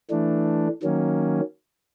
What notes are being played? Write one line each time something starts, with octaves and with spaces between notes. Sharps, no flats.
E3 A3 D4
D#3 F#3 A#3 C#4